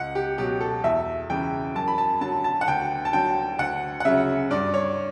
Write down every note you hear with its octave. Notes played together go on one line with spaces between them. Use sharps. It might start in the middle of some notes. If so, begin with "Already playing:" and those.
Already playing: C#2 F#5
G4
B2 F#3 G4
A4
E2 E5
C#3 E3 G5
F#2 A5
B5
A5
D3 F#3 A5
A5
F#5
D2 G5
A5
D3 F#3 G5
D2 F#5
F#5
C#3 F#3 E5
G2 D5
C#5